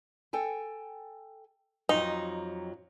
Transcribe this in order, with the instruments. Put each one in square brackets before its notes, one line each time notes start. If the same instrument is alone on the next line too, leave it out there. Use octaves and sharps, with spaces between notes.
[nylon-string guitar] A4 G5 G#5
[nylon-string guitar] F2 F#3 [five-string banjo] D#4